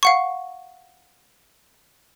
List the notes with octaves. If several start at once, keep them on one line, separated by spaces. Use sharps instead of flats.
F5 F#5 C#6